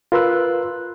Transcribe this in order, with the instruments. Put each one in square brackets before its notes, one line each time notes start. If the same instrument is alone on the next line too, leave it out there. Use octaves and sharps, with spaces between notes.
[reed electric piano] F4 A#4 B4 C6 E6 F#6